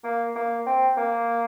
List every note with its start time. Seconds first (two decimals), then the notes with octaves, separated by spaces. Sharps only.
0.04 A#3
0.36 A#3
0.66 C4
0.97 A#3